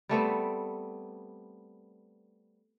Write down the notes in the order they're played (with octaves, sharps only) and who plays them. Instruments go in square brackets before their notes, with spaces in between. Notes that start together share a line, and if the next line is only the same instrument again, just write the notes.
[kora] G3 A3 B3 C4